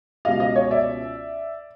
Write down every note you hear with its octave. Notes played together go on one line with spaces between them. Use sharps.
C#2 B2 G3 D#5 F5
D#5 F5
C#5 D#5
D5 E5